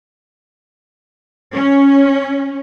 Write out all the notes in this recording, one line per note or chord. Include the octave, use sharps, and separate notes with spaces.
C#4